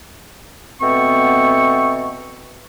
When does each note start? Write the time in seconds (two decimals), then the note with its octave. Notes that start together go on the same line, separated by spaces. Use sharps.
0.81 B2 A3 B3 C4 C#6